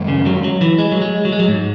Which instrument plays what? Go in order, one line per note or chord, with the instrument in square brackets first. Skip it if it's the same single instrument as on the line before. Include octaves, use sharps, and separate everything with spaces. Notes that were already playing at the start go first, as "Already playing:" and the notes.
Already playing: [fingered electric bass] F#2 D#3 G#3
[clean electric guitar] C#3
F#3
F#3
E3
G#3
F#3
G#3
F#3
G#3
F#3
G#2